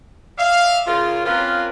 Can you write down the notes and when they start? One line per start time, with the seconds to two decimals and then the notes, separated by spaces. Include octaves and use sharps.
0.38 D5 E5 F5
0.86 C#3 F4 A#4
1.24 A#3 C4 C#4 F4 A#4 B4